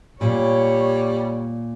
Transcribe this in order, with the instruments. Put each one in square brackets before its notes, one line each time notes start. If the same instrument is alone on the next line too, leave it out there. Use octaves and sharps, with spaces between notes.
[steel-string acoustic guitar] A#2 [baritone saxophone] G3 [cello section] C#5